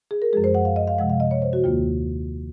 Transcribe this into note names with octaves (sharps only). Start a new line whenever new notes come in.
G#4
A#4
F#2 F3 G#3 G#4
C5
F#5
F5
D#5
F5
C3 F3 G#3 F#5
F5
D#5
C#5
C5
F#4
D#2 D#3 A#3 F4